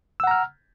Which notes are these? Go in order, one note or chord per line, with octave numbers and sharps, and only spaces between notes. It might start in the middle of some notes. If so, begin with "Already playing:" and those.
F#5 A#5 E6 F6